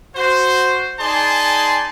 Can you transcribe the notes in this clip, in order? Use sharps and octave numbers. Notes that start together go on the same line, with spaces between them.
F#4 C5
D#4 G#4 D5 G#5 A5 C6